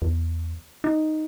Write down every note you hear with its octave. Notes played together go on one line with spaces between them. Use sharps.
E2
D#4